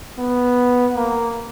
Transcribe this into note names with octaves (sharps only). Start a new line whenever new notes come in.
B3
A#3